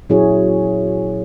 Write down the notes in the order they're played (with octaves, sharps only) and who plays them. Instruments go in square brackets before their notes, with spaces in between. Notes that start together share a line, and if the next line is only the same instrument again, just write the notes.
[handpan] A#2 F#3 C#4 E4 G#4 C#5